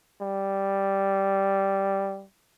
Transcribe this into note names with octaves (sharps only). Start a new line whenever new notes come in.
G3